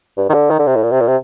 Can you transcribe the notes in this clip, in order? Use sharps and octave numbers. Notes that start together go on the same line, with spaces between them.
G2
D#3
D3
D#3
D3
C3
A2
A#2
C3
A#2
C3